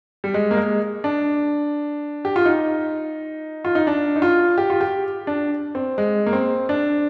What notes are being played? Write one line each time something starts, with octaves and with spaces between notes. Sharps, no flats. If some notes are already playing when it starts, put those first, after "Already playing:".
G3
G#3
A#3
G#3
D4
G4
F4
D#4
F4
D#4
D4
D#4
F4
G4
F4
G4
D4
C4
G#3
A#3
C4
D4